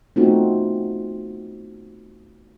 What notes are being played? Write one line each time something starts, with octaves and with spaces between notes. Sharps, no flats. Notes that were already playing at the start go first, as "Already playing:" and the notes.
A3 B3 C4 D#4 F4 F#4